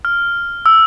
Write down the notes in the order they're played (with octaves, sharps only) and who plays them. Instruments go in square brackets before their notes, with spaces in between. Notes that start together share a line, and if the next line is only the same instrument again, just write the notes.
[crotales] F6
E6